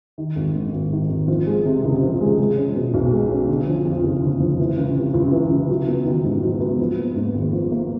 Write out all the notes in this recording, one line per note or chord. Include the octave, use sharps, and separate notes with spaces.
D#3
G#1
G#2
G#1
D#3
G#1
F3
G#3
C3
C#2
F3
G#3
G#3
C#4
B2
B1
G#3
C#4
D3
F3
F2
F#1
D3
F3
E3
C#2
C3
C#2
E3
C#2
F#3
B3
D#3
G#2
F#3
B3
F3
A#3
G#2
G#1
F3
A#3